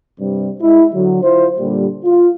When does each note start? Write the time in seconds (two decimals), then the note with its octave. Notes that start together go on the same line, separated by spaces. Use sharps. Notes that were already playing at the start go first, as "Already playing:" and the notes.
0.20 G2 C3 G3
0.61 G#3 E4
0.93 D3 F#3
1.22 E4 F4 C5
1.59 A#2 D3 G3
2.05 F4